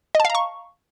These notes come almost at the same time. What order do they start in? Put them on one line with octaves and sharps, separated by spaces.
D#5 A5 F5 A#5 C#6